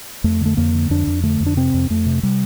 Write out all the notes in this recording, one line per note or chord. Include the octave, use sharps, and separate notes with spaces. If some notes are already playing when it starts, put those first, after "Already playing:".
F2 A3
D3 A3
F2 A#3
D3
F2 D4
F2
D3 A3
F2
D4
C3 C4
F2
F2 A3
C3
C3 G3